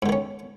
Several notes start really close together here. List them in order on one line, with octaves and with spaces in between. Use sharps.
G#2 D3 D#3 C#4